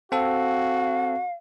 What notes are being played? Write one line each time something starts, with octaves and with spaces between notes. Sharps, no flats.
C4 F#4 A4 F5